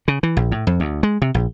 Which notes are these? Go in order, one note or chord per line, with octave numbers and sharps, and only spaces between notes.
C#3
E3
A#1
A2
F2
D2
G#3
C3
A#1